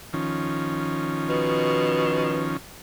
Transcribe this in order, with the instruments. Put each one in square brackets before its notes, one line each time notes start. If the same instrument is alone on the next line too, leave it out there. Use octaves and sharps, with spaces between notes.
[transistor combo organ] D#3 F3 C#4
[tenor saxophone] B2